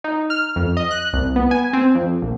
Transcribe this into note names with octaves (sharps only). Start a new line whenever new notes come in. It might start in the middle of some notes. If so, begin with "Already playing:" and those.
D#4
F6
F2
D#5
F#6
C2
B3
G#5
C4
F2
A#1